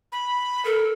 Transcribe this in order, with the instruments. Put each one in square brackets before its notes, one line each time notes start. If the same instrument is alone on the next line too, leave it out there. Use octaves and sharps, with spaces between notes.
[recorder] B5
[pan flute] A4 [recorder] A#4